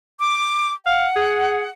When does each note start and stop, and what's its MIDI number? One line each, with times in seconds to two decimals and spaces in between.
0.19 0.73 86
0.86 1.07 77
0.86 1.70 78
1.16 1.66 68